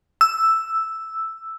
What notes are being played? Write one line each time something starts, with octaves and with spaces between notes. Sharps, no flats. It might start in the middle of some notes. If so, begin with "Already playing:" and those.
E6